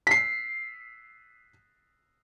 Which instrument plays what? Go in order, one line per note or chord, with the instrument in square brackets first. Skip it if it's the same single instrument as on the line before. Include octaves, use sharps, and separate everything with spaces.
[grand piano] B6 C7